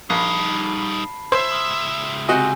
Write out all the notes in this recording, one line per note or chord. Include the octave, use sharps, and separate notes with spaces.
A#1 G3 D#4 A5 B5 C7
C#2 C5 E5 G#6
C6 D#6 F6
C3 F#4 D#5 G#5 G6